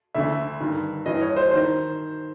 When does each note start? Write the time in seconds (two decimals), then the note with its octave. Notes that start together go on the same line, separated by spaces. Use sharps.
0.15 D2 D3 E5
0.60 G2 D#3
1.06 G2 E3 D#5
1.21 C#5
1.37 C5
1.51 D#3 C5